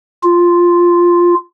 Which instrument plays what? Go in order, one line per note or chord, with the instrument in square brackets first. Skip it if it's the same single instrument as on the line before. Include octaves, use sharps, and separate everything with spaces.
[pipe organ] F4